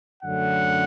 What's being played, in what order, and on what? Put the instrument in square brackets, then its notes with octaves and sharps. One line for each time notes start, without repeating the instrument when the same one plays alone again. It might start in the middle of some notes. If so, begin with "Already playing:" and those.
[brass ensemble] F#2 D3 A3 C#4 F#5